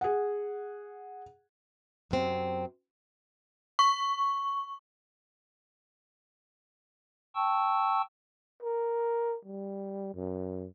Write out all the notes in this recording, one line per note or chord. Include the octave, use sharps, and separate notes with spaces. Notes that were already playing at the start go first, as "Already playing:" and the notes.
G#4 F#5
F#2 C3 C4
C#6
G5 A5 C#6 E6
A#4
G3
F#2